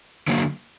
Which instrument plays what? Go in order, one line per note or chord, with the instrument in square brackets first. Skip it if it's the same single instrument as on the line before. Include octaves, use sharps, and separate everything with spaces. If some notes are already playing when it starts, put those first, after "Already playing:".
[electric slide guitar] D3 F#3 A#3